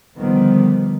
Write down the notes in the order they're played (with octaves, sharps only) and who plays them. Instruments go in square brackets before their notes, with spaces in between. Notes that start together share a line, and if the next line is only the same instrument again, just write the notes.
[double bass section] D3 D#3 F3 G3 B3